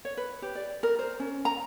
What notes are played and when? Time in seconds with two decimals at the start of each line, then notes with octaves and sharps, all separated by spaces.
0.05 C#5
0.17 B4
0.42 G4
0.55 D5
0.83 A#4
0.99 C5
1.20 C#4
1.45 A#5